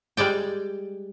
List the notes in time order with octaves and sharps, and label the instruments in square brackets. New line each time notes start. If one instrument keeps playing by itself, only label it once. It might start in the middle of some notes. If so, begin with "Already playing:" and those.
[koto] G3 G#3 D5 G5